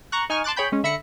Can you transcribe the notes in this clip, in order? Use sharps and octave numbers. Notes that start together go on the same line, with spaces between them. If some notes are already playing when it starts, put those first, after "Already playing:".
A#5 C#6 F#6
D#4 G#5 C#6 F6
A5 C6 D6 F#6 A6
G#4 C#5 G5 B5 G6
G#3 C#4
D3 E5 B5 A#6 C#7